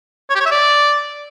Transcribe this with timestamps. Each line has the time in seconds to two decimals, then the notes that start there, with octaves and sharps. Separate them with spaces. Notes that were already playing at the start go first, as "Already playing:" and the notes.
0.30 C#5
0.35 G4
0.41 C#5
0.46 E5
0.51 D5